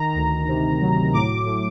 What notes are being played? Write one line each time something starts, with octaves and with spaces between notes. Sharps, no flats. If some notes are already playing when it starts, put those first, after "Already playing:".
Already playing: D#3 A#5
D2
C3
F#3
A2 D6
A2